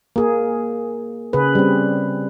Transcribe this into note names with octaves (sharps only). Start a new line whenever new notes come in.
A#3 G#4
C#3 G#4 B4
G3 C4